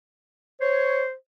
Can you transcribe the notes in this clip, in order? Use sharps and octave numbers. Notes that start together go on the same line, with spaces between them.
C5 C#5